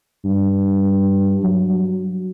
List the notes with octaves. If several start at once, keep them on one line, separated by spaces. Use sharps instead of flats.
G2
F#3